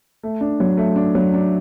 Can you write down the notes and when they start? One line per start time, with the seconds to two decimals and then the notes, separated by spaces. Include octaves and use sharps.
0.23 A3
0.41 D4
0.60 F#3
0.77 A3
0.96 D4
1.15 F#3
1.34 D4